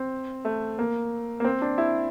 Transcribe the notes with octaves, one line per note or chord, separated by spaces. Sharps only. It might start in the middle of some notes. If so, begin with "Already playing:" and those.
Already playing: C4
A3
A#3
A#3
C4
D4
E4